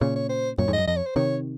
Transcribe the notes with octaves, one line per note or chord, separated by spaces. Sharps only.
A#2 C#3 C#5
C#5
C5
F#2 A#2 C#5
F2 G#2
D#5
F#2
F2 D#5
C#5
C5
C3 D#3 C#5